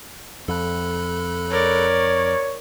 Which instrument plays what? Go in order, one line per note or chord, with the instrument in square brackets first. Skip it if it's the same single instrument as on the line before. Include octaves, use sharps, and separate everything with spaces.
[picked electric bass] F2 [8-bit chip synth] A4 B5 F#6
[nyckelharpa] A#4 D5 [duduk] C#5